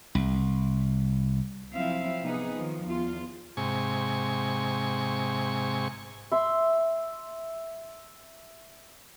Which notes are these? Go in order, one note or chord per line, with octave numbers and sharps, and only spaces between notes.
C2
F3 F#3 C4 E4 E5 F5
C3 B3 D#4 G#4 B4
D#3 F3
E2 F4
G#2 C3 G#5 C#6
E5 C6